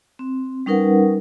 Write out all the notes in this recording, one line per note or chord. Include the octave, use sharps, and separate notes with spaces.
C4
G3 C#4 D#4 A#4 B4 F#5